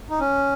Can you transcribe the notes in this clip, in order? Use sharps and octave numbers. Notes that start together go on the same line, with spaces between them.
D#4
C#4